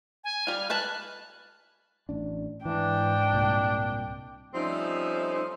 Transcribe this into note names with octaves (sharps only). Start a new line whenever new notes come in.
G#5
G3 F4 F6
B4 G#5 A5 F#6
A1 D4
G#2 E3 D4 G5
C2 A#2
F3 G3 A3 C4 C#4 D#4